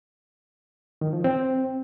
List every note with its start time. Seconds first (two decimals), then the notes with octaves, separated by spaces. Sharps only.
1.01 D#3
1.13 F3
1.24 C4